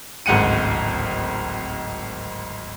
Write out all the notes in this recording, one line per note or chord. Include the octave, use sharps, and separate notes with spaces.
D1 G#1 C#2 F#5 C#7 D#7